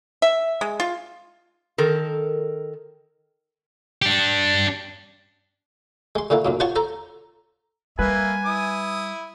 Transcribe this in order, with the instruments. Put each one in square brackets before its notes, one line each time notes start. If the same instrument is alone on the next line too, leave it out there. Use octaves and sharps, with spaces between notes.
[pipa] E5
G#3
F4
[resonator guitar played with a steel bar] D#3 A4 A#4
[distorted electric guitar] D4 G4
[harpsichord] G#3 C6
A#2 D3 A#3 E4
B1 F#2 A#2
F4 F#4 C5 C#5 A5 C#6
A4 C5 A#5
[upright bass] G3 [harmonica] A#3 E5 [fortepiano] B4 [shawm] G#5
[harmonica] E4 D#6